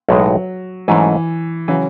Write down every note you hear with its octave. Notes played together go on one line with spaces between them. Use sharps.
B1 A2 F#3 G#3 D#4
G#2 E3 F#3 A3 C#4 F#4
C#3 E3 F#3 C#4 F#4